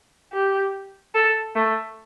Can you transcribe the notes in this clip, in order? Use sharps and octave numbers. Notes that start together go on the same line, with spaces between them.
G4
A4
A3